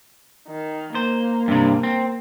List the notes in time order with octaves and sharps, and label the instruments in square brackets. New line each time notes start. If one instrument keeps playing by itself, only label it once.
[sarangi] D#3
[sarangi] A#3 [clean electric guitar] C5
[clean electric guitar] G2 C3
C4